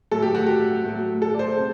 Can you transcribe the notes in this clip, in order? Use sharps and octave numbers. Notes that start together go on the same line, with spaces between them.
A2 F#3 A4
G4
F#4
G4
A2 F#3
A4
D5
C5
C3